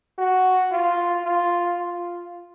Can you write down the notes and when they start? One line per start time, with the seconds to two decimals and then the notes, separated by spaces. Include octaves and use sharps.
0.18 F#4
0.72 F4
1.24 F4
1.78 F4